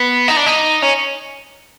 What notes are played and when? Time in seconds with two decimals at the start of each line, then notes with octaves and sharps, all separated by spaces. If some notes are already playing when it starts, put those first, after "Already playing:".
Already playing: B3
0.28 D#4
0.37 D4
0.46 D#4
0.82 C#4